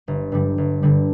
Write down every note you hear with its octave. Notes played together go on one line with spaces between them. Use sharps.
G1
G2 D3 G3
G1
G2 D3 G3